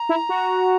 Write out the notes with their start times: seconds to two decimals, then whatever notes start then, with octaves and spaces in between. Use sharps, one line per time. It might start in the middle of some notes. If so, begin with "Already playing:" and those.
Already playing: A#5
0.09 E4
0.29 F#4